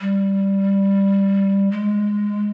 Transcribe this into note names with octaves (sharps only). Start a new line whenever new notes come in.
G3
G#3